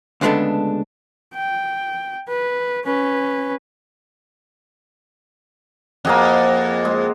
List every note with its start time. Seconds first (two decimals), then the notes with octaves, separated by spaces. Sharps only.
0.21 D2 C#3 G#3 B3 D4 A4
1.34 G5
2.28 B4
2.85 C#4 B4
6.05 F2 A#3 G#4 F#5
6.85 G#3